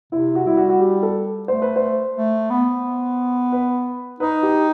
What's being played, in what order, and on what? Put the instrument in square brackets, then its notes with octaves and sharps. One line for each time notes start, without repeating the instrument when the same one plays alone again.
[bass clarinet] C3 [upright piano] E4
[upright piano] F#4
[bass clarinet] G3 [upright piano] E4
[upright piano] F#4
F#4
G4
A4
[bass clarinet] A3 [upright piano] C5
[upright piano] B4
C5
[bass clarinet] A3
B3
[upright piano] B4
[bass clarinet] D#4 [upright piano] B4
[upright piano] G4